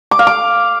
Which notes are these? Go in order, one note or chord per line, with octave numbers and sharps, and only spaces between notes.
D6
F5
D6